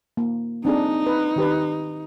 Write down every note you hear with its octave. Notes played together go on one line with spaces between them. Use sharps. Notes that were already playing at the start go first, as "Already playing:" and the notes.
A#3
C4 D4 D#4 G#4
B4
D#3 G4 B4